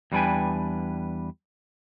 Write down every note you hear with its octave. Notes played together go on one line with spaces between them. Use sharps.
E2 G3 D4 B4 G5 G#5